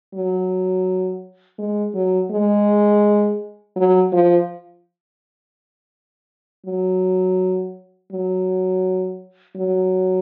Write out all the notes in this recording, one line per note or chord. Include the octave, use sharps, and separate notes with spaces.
F#3
G#3
F#3
G#3
F#3
F3
F#3
F#3
F#3